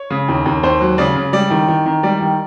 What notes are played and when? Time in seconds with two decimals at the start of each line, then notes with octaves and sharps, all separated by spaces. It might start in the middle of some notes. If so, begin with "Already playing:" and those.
Already playing: C#5
0.10 C#3
0.28 D#2
0.46 D#2
0.63 D#2 C5
0.81 F#3
0.98 C#3 D5
1.16 C#3
1.33 G3 D5
1.50 D#3
1.68 D#3
1.86 D#3
2.03 G3 D5
2.21 D#3